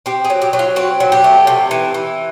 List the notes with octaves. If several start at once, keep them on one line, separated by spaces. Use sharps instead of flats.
C4 G4
G#4
F#3
G4
F#3
F4
C4 F#4
F#3
G4
A3
C3
E3
E3